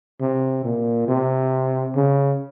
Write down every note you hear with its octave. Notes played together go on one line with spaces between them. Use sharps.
C3
A#2
C3
C#3